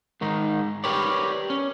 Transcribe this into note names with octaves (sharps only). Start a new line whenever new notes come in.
G#2 D#3 D#4
G4 A#4 B4 C#5 D5
C#4